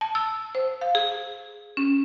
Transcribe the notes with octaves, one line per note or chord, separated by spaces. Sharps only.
A5
E6
C5
F5
G#4
C#4